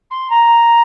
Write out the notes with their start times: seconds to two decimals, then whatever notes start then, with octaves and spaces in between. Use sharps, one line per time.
0.10 C6
0.30 A#5